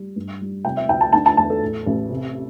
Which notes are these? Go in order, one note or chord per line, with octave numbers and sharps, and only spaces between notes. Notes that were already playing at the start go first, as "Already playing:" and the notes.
Already playing: G3
G2
G3
C3 G5
E5
D2 G5
A5
D3 A5
A5
E2 A5
A4
A2
A1
C3